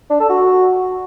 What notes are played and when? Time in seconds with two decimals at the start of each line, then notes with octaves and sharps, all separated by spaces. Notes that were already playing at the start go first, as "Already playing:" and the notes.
0.10 D4
0.20 A4
0.30 F#4